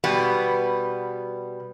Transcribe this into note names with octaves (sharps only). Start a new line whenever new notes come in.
B2 G3 B3